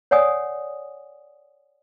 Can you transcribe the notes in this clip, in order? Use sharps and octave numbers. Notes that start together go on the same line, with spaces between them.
C#5 D5 F#5 G#5 D#6